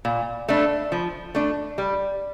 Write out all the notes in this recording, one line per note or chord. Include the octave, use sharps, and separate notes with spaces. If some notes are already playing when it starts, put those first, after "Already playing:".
A#2
A3 D4
F3
A3 D4
G3